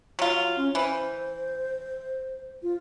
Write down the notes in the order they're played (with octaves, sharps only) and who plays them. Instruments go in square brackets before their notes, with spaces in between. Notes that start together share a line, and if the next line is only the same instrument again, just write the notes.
[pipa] F#3 F4
[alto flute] C#4
[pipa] E3 [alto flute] C5
[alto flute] F4